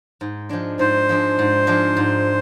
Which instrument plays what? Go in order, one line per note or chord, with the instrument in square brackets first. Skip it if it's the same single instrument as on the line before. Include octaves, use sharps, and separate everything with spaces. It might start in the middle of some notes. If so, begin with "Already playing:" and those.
[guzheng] G#2
F3 G#3 D4
[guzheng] G#2 [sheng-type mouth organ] C5
[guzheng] F3 G#3 D4
G#2
F3 G#3 D4
G#2